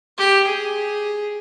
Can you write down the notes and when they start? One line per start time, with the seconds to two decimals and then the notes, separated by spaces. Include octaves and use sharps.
0.18 G4
0.47 G#4